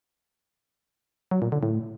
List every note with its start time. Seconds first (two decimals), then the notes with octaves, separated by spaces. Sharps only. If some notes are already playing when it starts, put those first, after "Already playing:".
1.31 F#3
1.42 A#2
1.52 D3
1.63 A2